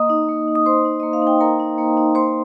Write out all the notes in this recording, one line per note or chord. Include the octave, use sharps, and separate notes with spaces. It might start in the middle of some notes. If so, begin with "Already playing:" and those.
Already playing: A#3 D#5 D#6
D#4
A#3
D#4
D#6
A#3 C5 C6
D#4
A#3 D#5
F5
D#4 G5
A#3 A#4 A#5
D#4
A#3
D#4
A#3 C5 C6